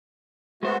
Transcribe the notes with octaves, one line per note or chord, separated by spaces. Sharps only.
G#3 A3 B3 F#4 C5